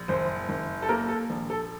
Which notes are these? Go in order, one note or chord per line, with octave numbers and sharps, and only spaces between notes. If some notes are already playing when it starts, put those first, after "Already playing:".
Already playing: A#1
F#1 C5
F#1
A4
A#3 A#4
A4
A#1
A4